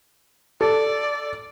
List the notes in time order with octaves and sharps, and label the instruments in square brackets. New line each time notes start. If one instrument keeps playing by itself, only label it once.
[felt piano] A4 [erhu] D5